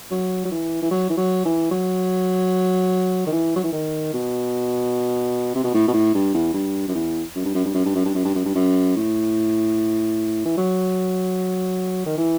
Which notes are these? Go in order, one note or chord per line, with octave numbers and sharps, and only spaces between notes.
F#3
F#3
E3
E3
F#3
E3
F#3
E3
F#3
D#3
E3
F#3
E3
D#3
B2
C3
B2
A2
B2
A2
G2
E2
G2
F#2
E2
F#2
G2
F#2
G2
F#2
G2
F#2
G2
F#2
G2
F#2
G2
F#2
A2
E3
F#3
D#3
E3